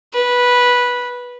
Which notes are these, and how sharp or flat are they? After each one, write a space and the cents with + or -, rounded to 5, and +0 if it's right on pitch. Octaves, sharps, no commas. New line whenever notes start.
B4 -10